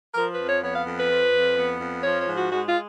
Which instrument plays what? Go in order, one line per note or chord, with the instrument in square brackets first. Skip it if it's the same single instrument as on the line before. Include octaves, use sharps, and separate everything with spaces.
[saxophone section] F3 A#4
B4
F2
C#5
B3 C#5
F5
F2
B4
F3
F2
B3
F2
F3 C#5
C#5
G#2
F#4
G#3 F#4
F4